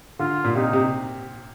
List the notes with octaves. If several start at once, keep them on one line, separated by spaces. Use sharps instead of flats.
D3 F4
A#2
C3 D#4
C3